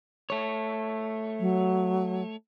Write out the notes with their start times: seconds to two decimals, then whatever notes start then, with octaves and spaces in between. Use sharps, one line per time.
0.30 A3 C#5
1.40 F#3